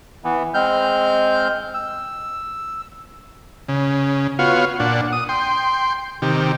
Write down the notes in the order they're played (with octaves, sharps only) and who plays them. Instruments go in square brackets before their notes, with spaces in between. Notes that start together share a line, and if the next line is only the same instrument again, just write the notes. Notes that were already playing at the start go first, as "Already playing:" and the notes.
[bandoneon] E3 B3
G#3 C4 F6 G6
E6
[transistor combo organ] C#3
B3 F4 F#4 C#5 F5
A#2 D4 F#5
D#6
G5 C6
C3 D#3 G4